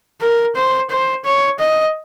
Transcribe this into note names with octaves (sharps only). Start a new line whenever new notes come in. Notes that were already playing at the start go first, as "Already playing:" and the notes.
A#4
C5
C5
C#5
D#5